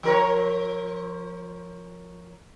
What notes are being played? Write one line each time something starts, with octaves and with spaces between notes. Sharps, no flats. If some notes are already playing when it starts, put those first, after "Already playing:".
F3 A#4 C#5